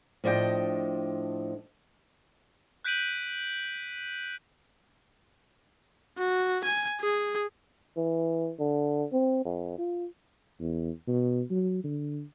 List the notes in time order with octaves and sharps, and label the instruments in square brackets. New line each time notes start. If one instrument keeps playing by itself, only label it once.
[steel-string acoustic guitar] A2 F3 D4 D#5 G5
[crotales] F#6 G6 B6 D7 D#7 F#7
[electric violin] F#4
G#5
G#4
[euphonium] E3
D3
C4
F2
F4
[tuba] E2
B2
F#3
D3